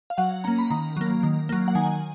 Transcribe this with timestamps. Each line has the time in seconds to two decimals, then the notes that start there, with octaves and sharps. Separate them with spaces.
0.10 F5
0.18 F#3 F#5
0.44 A#3 C#4 A#5
0.58 B5
0.71 D#3 A#5
0.97 F#3 A#3
1.23 D#3
1.49 F#3 A#3
1.68 F#5
1.75 D#3 G#5